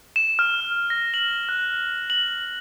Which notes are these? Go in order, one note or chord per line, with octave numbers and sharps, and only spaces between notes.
E7
F6
A#6
F#7
F#6
F#7